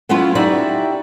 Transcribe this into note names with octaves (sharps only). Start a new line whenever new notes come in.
F#3 B3 C#4 E4 F4
D#4 E4 F#4 G4 D5 E5